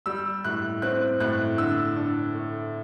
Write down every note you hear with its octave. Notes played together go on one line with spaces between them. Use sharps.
G3 E6
A2 F#6
C4 F#6
A2 F#6
D3 E6
D4
A3